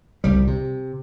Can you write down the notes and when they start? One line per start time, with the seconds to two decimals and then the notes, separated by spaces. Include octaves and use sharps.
0.24 C2 G3
0.47 C3